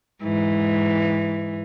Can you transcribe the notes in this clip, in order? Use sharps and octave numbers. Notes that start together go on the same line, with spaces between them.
G#2 E3